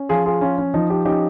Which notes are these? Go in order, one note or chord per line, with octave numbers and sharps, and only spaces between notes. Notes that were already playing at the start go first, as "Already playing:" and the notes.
Already playing: C#4
F3 F4 G#4
F4 G#4
C#4 F4
C#4
F3 D#4
D#4 G4
C#4 D#4 G4